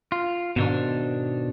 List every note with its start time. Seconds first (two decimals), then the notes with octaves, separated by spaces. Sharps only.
0.12 F4
0.56 G#2 B2 D#3 D4